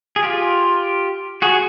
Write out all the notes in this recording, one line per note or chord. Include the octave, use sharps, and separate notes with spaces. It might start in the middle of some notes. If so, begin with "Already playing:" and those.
G#4
F4 G4
F#4 G#4